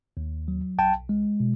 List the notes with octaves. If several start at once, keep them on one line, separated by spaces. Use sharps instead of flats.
D#2
F#3
B1 G5 A5
G#3
B2